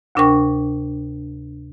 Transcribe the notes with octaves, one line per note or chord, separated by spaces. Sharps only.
D2 C3 D4 A#4 G5 C#6